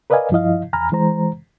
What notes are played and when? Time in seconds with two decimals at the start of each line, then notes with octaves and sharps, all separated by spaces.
0.10 A#4 B4 D5 D#5 F5 G#5
0.31 G2 F3 E4 D#5 F5
0.73 E2 G#5 A#5 B5 F6
0.92 E3 G#3 C5 A#5